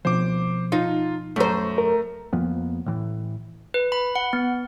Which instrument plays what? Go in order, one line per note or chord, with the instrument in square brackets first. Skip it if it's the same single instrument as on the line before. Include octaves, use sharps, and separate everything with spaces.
[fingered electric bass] B2 F3 C4 [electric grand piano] C5 D6
[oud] D#4 [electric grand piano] F4
[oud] F#2 C5 [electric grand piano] A3 A#5
[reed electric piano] A#4
[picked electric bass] F2 F3 A#3 B3
A2 E3
[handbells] B4
B5
F#5
B3